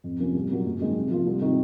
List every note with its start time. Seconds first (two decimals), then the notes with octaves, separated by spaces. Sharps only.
0.04 F2
0.19 C3 F3 A#3 C#4
0.34 C2
0.50 A#2 F#3 A#3
0.65 F#1
0.81 F#2 D#3 G#3
0.96 C3
1.10 F3 A#3 F4
1.26 C2
1.40 C3 D#3